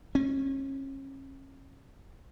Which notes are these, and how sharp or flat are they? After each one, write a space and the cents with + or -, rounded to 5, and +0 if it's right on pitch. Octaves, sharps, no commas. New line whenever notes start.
C#4 -35